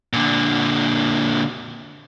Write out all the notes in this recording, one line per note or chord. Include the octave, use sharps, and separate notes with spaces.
A#2 D3